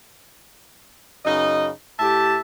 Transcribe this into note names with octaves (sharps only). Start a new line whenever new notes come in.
F#2 C#3 D#4 D#5
A2 G4 E5 A5